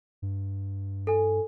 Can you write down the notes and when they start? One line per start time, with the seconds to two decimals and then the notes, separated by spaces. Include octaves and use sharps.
0.22 G2
1.07 A4 G#5